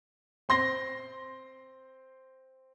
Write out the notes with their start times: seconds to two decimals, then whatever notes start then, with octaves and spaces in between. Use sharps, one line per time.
0.49 C4 C6 A#6 G7